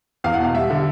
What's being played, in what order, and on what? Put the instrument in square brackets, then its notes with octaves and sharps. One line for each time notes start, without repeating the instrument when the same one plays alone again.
[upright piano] E2 F5
F#5
B2
F5
G3 E5
D3